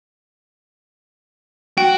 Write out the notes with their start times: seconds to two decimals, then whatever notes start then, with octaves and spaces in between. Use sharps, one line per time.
1.78 F#4 G5